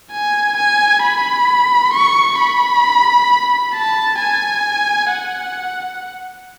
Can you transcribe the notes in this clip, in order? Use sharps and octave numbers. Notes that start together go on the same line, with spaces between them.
G#5
G#5
B5
C#6
B5
A5
G#5
F#5